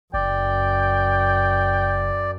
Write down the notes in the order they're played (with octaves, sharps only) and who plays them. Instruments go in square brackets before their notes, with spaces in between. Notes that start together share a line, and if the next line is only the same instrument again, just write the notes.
[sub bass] F#1 [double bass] F#2 [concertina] D5 [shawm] G5